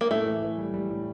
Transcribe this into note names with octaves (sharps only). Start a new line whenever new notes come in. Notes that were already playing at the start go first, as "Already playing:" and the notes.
A#3
A2 A3
E3
E3
G3
G3
A2